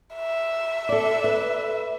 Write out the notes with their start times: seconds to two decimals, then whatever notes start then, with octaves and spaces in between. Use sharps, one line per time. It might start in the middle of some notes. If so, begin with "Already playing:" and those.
0.16 E5
0.89 A4 D5
1.24 B4